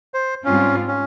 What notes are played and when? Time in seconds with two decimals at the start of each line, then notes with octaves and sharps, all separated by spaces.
0.14 C5
0.44 G#2 G3 C4 C#4 F4
0.88 C#4